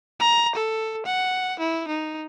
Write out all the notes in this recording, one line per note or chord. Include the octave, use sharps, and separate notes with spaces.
A#5
A4
F#5
E4
D#4